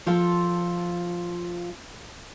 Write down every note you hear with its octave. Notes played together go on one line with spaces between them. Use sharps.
F3 F4 A4